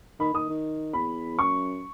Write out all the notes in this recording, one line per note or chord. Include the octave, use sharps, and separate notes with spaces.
D#3 B5
D#3 D#6
D#3
E2 B5
F#2 C#6